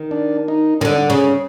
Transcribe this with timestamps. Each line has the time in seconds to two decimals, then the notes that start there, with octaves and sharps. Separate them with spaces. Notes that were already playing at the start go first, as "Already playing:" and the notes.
Already playing: D#3
0.11 D4
0.48 D#4
0.81 D#3 C#4
0.85 D3 D4
0.98 D4
1.10 C#3 C#4